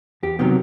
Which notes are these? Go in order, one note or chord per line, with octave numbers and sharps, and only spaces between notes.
E2 G4
C3 D#3 F#3 B3 G4